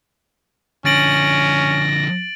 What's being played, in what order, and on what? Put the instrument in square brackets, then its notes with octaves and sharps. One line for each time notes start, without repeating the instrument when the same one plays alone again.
[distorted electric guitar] D3 F3 [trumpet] C#4 [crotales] A6 D7 F#7 [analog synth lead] A#6